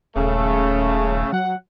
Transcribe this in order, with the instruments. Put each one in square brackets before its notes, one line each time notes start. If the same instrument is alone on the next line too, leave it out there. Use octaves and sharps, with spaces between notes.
[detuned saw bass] D#1 [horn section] C#3 A3
[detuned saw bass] F#3 [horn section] F#5